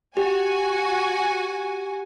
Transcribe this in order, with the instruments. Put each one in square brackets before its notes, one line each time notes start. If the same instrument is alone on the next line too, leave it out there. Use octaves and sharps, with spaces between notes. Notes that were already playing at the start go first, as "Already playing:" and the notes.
[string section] F#4 G#5 [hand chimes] G4